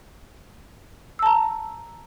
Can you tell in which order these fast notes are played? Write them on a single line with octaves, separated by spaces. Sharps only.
E6 A5 A#5